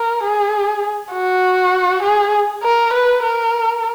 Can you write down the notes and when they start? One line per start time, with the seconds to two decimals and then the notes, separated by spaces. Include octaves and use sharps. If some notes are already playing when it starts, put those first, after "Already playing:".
Already playing: A#4
0.23 G#4
1.13 F#4
2.03 G#4
2.63 A#4
2.93 B4
3.23 A#4